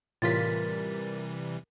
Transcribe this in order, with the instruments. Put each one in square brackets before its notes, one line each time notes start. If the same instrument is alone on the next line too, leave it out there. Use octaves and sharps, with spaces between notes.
[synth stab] A2 F4 B6 [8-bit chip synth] C3 E3 G3 [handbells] A#4 A6